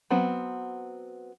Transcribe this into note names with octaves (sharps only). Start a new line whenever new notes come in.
F#3 B3 C4